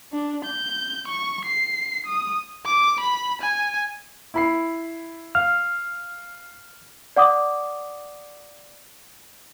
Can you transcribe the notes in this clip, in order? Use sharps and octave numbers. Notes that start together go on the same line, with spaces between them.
D4
G6
C#6
C7
D#6
D6
B5
G#5
E4 B5 C7
F5 F6
D5 F#5 D6 D#6